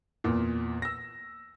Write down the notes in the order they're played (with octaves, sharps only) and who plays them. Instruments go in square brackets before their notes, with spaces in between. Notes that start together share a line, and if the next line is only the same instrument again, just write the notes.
[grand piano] E2 A#2
E6 A#6